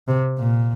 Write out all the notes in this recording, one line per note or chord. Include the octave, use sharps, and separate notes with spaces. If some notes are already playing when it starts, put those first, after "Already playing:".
C3
A#2